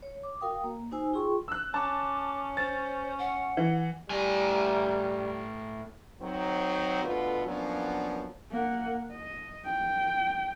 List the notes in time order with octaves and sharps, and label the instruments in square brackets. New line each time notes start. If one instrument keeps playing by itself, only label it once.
[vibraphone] C#5
D6
F#4 A#4 F5 G5 D#6
A#3
D#4 F#4 C5 G#5 E6
F4 G#4 G5 C6 C#6
[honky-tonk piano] E6 F#6
[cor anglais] C#4 [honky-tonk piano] A5 [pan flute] D6
[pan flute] C5 [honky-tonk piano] A6
[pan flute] F#5
[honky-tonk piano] E3
[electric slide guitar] A2 G#5 [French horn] G3
[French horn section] D#3 F#3 C4
B2 D3 A3 F4 F#4 B4
F3 F#3 A#3 B3 C#4 D4
[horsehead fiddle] A#3 F#5
D#5
G5